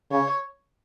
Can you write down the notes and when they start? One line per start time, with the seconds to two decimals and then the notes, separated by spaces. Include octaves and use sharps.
0.11 C#3 C#5